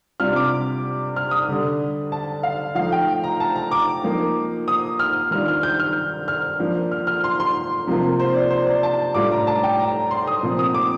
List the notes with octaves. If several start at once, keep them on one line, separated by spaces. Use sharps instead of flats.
C3 G3 D4 F4 F6
D6
F6
D#6
D3 G3 D4
A5
F5
F3 A3 D#4 F5
G5
A#5
A5
A#5
D6
F3 A#3 D#4
D#6
F6
D#3 G3 D4 F4 F6
F6
G6
F6
F6
F3 A#3 D4
F6
F6
C6
C6
C3 F3 A#3 F4
C5
D5
C5
D5
A5
A2 G3 D4 F4 D6
A#5
A5
G5
A#5
C6
D#6
A#2 F3 C4
D#6
D6